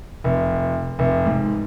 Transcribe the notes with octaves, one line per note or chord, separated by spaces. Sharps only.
F1
F1
G#2